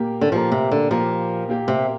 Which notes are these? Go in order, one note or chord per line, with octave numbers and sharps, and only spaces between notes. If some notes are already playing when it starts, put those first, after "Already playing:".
Already playing: A#2 A#3 G4 A#4
D3
A#2 F3 A#3 G4 A#4
C3
D3
A#2 F3 A#3 G4 A#4
A#2 A#3 G4 A#4
C3